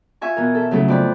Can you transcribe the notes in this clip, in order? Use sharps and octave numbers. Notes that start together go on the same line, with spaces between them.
F4 E5 G#5 C#6
B2 E3 A#4
A4 E5
C#3 F#3 A3 C#4 E4 A4
F2 D5 B5